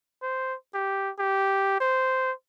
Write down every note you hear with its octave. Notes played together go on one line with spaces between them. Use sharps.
C5
G4
G4
C5